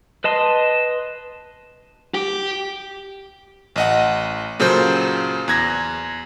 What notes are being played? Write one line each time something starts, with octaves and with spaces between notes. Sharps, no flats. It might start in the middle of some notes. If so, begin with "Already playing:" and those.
B4 D#5 A5 C6
G4
A1 D#5 F#5
A#2 C#3 F#3 A4 C5 G6
E2 F#6 G#6 A#6